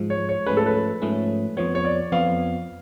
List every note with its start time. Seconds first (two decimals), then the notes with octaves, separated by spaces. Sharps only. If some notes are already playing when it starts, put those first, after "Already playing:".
Already playing: G#2 F3 G#3
0.10 C#5
0.29 C#5
0.46 G#2 F3 A3 C#4 B4
0.57 A4
0.66 B4
1.02 G#2 F3 A3 C#4
1.57 F2 F3 B3 C#5
1.75 C#5
1.85 D5
2.12 F2 F3 B3 F5